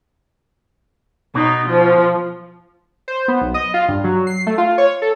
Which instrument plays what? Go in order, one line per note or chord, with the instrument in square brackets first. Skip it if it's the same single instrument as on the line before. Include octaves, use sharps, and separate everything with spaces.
[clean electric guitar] B2 [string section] D#4
[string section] F3
[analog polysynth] C5
B3
B1
D#5
F4
G2
F#3
C7
A3
F4
C#5
A4